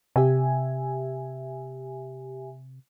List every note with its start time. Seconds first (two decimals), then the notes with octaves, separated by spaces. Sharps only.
0.16 C3 G4 E5 G#5